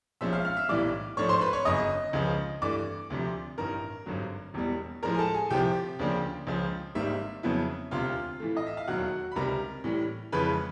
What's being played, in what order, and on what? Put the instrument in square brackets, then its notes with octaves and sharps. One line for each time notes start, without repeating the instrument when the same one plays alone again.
[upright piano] B1 A#2 F3 G#3 C#4 E5 E6
F5 F6
F5 F6
E5 E6
B1 A2 E3 G3 D5 D6
G#2 F3 A3 D4 C#5 C#6
C5 C6
B4 B5
C#5 C#6
G1 F#2 C#3 D#5 D#6
C#2 C#3 F3
G2 E3 A3 D5 D6
D2 C3 F3
A1 G2 D#3 A#4 A#5
G#1 G2 D3 F#3
E1 E2 B2 G3
A2 F3 G#3 A#4 A#5
G#5
A4 A5
G#4 G#5
C2 C3 F3 G4 G5
D2 C#3 F3 A#3 D4
C#2 C#3 F3
G#1 G#2 D#3 G3 A#3 E5
F2 C#3 F#3 B3 E4
E1 D2 C3 F4 F5
A2 E3 A3
D#5
E5
F5
E1 D#2 D#3 F#3 F#4 F#5
B5
C#2 C3 D#3 G3 A#4 A#5
A2 E3 G3
F2 C#3 E3 G#3 C#4 B4 B5